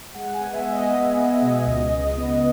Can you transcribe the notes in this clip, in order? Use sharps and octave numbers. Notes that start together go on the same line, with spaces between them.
G#3 F#5
G#5
B3
E5
G#3
D#5
B3
B3
B2
C#2
C#2
B3